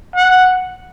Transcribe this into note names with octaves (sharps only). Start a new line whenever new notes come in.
F#5